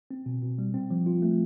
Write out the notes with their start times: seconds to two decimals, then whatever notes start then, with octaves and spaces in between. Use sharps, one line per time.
0.11 C4
0.26 B2
0.42 B2
0.59 G3
0.74 C4
0.90 F3
1.06 F4
1.22 A3